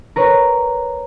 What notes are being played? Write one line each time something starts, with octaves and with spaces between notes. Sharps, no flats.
A#4 B4 C#5